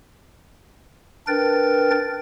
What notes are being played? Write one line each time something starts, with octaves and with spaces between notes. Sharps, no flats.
D4 A#4 B4 G5 A6